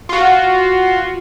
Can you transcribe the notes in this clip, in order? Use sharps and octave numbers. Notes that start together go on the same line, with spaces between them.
F4 F#4